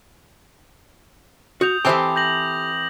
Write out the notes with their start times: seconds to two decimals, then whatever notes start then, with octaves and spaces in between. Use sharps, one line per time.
1.61 F#4 D#6 G6 F7
1.85 E3 C4 G4 A4 C5 G5 D6
2.16 G6 A#6 F#7